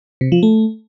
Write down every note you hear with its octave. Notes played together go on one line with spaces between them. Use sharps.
C3
F3
A3